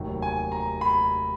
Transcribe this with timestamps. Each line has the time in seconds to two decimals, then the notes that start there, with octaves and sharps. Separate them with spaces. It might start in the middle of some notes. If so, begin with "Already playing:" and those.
Already playing: F1 D#2 D#3 F#3
0.22 G#5
0.52 A#5
0.81 B5